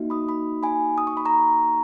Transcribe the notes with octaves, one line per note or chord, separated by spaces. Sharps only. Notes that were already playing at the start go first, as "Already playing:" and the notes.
Already playing: A#3 D#4 F#4
B5 D#6
B5 D#6
G#5 B5
D#6
C#6
B5
A#5 C#6